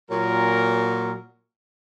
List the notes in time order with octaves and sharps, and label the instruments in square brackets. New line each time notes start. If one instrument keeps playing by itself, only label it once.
[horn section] A#2 F#3 A#4